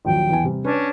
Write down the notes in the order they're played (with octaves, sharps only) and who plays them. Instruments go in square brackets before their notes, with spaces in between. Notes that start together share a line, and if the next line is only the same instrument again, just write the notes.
[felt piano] A#1 D#2 F#3 [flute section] G5
[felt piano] E2 E3 G#5
C3 G3
[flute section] C#4 D4 [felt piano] B4 C#5